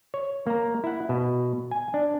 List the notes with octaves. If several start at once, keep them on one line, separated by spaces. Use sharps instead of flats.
C#5
A#3 A#5
E4 F#5
B2
G#5
D4